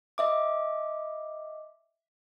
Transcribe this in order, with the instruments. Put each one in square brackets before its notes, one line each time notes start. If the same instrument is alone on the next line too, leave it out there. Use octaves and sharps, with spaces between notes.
[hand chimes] D#5 E5 D6